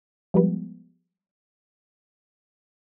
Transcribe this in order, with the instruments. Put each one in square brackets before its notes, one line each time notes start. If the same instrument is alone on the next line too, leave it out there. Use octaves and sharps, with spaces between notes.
[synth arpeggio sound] F3 G3 G#3 B3